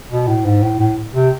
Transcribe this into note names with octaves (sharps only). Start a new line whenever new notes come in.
B2
A2
G#2
A2
A2
C3